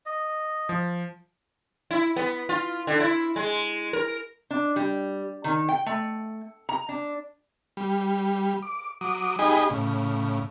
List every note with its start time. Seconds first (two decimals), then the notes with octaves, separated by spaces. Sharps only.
0.06 D#5
0.69 F3
1.91 E4
2.16 B3
2.49 F4
2.87 D3
3.00 E4
3.36 G#3
3.93 A#4
4.50 D4
4.76 G3
5.44 D#3
5.69 G5
5.86 A3
6.69 A#5
6.89 D4
7.77 G3
8.62 D6
9.01 F#3 D6 D#6
9.39 D#4 G4 G#4 D#5 G#5 B5
9.70 A2 C#3